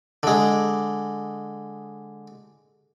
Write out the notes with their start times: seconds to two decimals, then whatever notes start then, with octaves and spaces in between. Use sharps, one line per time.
0.23 D3 G#3